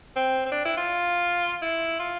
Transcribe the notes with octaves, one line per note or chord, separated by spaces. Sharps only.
C4
C4
D4
E4
F4
E4
F4